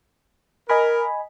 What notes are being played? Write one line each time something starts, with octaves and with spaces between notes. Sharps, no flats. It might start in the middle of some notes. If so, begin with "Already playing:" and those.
A#4 D#5 G#5 B5